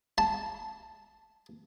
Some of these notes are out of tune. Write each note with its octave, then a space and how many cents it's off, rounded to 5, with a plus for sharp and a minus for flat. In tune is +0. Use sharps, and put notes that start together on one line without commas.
A5 -10